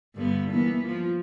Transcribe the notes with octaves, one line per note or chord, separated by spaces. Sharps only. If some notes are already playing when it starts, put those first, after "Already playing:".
G2 D3 B3
E3 A#3 B3
F3